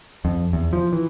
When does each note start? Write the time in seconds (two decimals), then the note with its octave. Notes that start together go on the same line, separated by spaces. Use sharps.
0.25 F2
0.53 E2
0.73 F3
0.93 E3